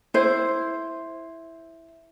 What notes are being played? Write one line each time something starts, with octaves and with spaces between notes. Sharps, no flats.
E4 C5